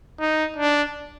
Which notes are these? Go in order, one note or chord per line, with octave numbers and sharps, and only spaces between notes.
D#4
D4